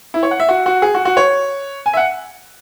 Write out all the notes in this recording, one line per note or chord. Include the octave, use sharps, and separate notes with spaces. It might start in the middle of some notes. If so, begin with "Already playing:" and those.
E4
C#5
F#5
E5
F#4
F#4
G#4
F#4
F#4
C#5
G#5
E5
F#5